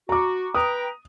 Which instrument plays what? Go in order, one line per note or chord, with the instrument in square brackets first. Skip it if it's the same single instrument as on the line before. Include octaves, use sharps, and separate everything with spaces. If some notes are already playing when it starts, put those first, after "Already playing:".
[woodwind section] F#4 [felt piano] A#5 D6
[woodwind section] B4 G5 A#5 [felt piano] D#6